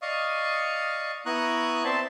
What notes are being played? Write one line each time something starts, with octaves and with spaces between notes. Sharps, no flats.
D5 D#5 F5 C#6 D#6
B3 E4 A#5 C#6 D#6 F#6
C4 D5 E5 A5 C6